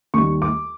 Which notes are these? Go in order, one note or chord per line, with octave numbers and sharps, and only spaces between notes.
D#2 D#3 G3 C#6
D6